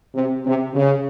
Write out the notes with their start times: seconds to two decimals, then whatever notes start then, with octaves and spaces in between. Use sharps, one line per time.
0.15 C3
0.45 C3
0.74 C#3